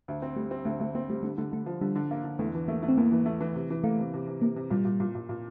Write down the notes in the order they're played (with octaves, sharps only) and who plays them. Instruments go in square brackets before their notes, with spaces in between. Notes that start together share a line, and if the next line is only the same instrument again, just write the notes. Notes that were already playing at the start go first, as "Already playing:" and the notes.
[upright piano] D2
C4
[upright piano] G3 [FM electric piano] A3
[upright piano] C4
[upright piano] D2 [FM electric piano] A3
[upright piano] D2 [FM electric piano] A3
[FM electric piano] A#3 [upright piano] C4
[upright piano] G3 [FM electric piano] A3
[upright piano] D3 [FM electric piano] A3
[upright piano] D3 [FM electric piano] A3
[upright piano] D3 [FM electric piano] A3
[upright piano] F3
[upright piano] D3 [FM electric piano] G3
[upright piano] D3
A#3
D3
[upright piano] E2 [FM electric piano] A3
[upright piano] E3
[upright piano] A3 [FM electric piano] A#3
[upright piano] A3
[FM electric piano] C4
[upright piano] E2 [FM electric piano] A#3
[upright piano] E3
A3
E3
C3
E3
[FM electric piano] A3 [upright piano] A#3
[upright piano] C3
C3
C3
[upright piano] C3 [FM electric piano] A#3
[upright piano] C3
[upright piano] A#2 [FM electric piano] G3
[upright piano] A#2
A#2
A#2
A#2